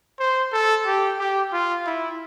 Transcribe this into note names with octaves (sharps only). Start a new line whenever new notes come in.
C5
A4
G4
G4
F4
E4